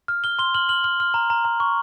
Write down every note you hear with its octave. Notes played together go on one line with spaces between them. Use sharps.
F6
F6 G7
C6 G7
F6 F#7
F6 F#7
F6 F#7
F6
A#5
A#5
A#5
C#6